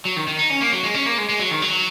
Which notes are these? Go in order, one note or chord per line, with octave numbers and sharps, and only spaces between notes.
F#3
D#3
D#3
D#4
C#4
A#3
F#3
G#3
C#4
A#3
G#3
G#3
F#3
D#3
F#3